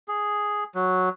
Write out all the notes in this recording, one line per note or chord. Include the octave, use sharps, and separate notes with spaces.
G#4
F#3